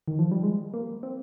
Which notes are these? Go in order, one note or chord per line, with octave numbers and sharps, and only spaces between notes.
D#3
F3
G3
G#3
A#3
C4